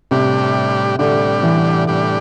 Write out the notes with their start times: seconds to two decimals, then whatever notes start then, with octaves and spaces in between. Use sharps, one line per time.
0.11 A2 C3 G3 D4 G4 D5
0.99 A2 D3 G3 D4 G4 D5
1.43 E3
1.87 A2 G3 D4 G4 D5